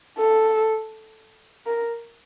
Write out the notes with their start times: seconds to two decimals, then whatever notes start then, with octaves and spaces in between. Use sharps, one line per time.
0.18 A4
1.67 A#4